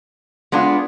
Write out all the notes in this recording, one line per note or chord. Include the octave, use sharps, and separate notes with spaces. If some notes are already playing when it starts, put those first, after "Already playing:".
G#3 B3 D4 F4